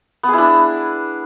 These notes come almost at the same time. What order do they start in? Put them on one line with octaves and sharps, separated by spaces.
B3 G#4 E4 D4